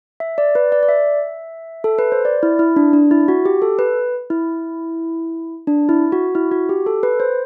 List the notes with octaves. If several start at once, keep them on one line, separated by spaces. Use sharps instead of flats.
E5
D5
B4
D5
D5
E5
A4
B4
C5
D5
E4
E4
D4
D4
E4
F#4
G4
A4
B4
E4
D4
E4
F#4
E4
F#4
G4
A4
B4
C5